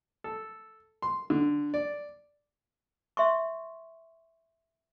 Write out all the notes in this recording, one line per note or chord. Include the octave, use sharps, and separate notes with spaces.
A4
C6
D3
D5
E5 C6 C#6